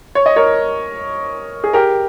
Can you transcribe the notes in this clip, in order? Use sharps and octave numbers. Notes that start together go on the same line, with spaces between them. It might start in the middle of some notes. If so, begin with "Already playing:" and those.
C#5
D#5
A#4 C#5
G#4
G4 A#4